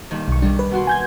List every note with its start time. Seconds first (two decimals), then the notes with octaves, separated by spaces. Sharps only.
0.11 G2 A#2 D#3
0.28 B1 C#6
0.42 D#3 G3 D4
0.59 B4
0.71 B2 F#4 C6
0.87 G#5 G6 G#6